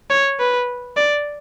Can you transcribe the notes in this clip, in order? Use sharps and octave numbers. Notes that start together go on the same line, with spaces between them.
C#5
B4
D5